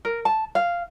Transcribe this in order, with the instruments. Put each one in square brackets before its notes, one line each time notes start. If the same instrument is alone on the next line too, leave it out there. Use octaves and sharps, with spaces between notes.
[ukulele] A#4
A5
F5